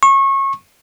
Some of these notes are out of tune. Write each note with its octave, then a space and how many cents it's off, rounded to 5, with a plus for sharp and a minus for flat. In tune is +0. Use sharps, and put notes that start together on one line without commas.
C#6 -25